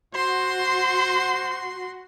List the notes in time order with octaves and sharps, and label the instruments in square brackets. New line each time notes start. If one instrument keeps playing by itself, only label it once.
[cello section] F#4 [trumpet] C5 [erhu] C6